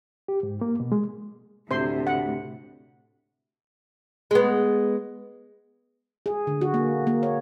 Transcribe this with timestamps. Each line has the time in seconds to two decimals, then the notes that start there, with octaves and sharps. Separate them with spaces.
0.28 G4
0.43 G#2
0.61 A#3
0.80 B2
0.92 G#3
1.71 D2 A2 C3 C5 C6
2.07 F#5
4.31 G#3 B3
6.26 G#4
6.47 D3
6.61 F#4
6.74 A#3
7.07 A#3
7.23 C#5